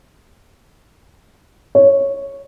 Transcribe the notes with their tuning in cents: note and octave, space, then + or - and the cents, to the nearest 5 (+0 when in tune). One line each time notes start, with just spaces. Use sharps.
C#5 -5